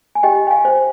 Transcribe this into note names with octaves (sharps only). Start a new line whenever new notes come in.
G#5
G4 D#5 G5
G5
F5 G#5
C5